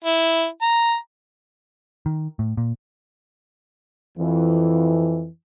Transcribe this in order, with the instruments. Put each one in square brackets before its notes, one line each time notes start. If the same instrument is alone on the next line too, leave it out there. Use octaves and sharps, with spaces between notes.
[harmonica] E4
A#5
[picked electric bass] D#3
A2
A#2
[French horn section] F2 E3